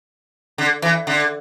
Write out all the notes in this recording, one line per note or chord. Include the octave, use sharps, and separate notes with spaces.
D3
E3
D3